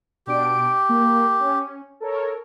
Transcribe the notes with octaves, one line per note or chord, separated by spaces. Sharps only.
B2 D4 G4 D7
A#3
C#4
A4 A#4 C#5